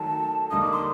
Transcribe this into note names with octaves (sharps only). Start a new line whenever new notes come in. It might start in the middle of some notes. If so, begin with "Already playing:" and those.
Already playing: D#3 F#3 A3 D#4 A4 A5
D3 G3 A#3 D#4 D#6
D6
C6